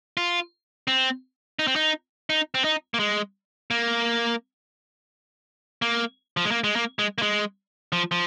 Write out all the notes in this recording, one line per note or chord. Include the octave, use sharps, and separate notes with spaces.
F4
C4
D#4
C4
D#4
D#4
C4
D#4
A#3
G#3
A#3
A#3
F3
G#3
A#3
G#3
A#3
G#3
A#3
G#3
F3
F3